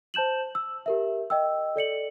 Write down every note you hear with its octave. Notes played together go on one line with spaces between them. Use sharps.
C5 A5 G6 E7 F#7
E6
G4 A#4 E5
D#5 G5 E6
A4 D5 C#7 F#7